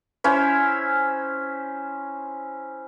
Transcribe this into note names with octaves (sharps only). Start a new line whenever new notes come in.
C#4 E4 C5